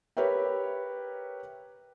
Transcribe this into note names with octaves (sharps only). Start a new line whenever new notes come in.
G4 A#4 B4 C#5 E5 G5